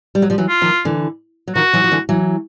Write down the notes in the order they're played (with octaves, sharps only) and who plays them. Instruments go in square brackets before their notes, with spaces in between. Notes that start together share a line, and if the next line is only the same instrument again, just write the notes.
[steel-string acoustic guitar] G3
F#3
F3 G3
E3 F#3
[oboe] F4
[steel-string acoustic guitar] D#3 F3
D3 E3
F#3
[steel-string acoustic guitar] D#3 F3 [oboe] F#4
[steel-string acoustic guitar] E3 F#3
F3
D3 E3
E3 F#3